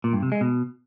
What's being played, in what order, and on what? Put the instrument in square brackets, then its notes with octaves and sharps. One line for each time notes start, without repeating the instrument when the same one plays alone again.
[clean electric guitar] A#2
G2
C3
G#3
B2